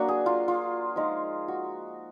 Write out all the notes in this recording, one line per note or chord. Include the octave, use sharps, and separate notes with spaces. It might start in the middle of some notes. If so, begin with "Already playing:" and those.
Already playing: F#3 A#3 D4 F#4
G#4
F4
F4
F3 G#3 D#4
F#4